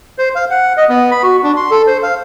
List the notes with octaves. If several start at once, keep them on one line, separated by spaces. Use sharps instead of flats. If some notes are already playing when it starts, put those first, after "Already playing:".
C5
F5
F#5
D#5
B3
B5
F#4
D4
C6
A4
C5
F5